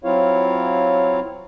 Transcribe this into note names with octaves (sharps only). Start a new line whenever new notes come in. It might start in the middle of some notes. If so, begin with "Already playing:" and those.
F#3 C4 E4 F4 C#5 F5